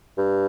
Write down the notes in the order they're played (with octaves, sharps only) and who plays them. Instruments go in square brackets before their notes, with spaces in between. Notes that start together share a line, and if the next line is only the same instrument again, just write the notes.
[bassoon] G2